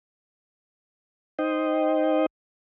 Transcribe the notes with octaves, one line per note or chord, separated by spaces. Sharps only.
D#4 C5 D#5 G5